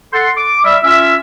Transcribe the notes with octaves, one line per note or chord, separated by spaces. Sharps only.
A4 F#5 C6
D6
G3 E5
C#4 F4 E5